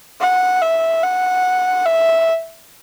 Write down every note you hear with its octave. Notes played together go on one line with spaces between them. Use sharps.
F#5
E5
F#5
E5